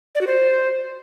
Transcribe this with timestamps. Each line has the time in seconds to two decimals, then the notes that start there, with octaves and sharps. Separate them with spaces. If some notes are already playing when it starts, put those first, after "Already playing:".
0.15 D5
0.21 F#4
0.27 C5